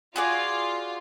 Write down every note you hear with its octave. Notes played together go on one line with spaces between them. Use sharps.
F4 F#4 G#4 D5